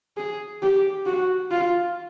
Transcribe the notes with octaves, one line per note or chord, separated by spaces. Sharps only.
G#4
G4
F#4
F4